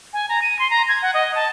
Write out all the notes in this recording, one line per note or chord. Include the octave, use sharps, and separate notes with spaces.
G#5
A#5
D#7
C6
A#5
G#6
F#5
D#5
A5